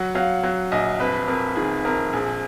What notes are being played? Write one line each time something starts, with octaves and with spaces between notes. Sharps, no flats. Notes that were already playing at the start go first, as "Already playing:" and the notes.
Already playing: F#3 F#5
F#3 F5
F#3
A#1 D#5
F2 B4
F2 A#4
D#3 G#4
F2 A#4
A#1 G#4